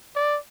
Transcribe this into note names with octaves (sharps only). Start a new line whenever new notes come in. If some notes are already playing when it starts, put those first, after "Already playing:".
D5